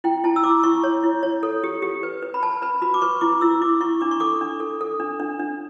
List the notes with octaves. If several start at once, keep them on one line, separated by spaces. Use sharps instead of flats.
E4 G5
E4 A5
E6
E4 D6
E4 C#6
C#5
E4
C#5
A4
G4
G4
B4
B4
B5
B4 A5
B4 B5
F#4 B5
D6
B4 C#6
E4 D6
E4 E6
E4 D6
E4 C#6
D4 D6
C#6
A4 D6
D4
A4
A4
D4
D4
D4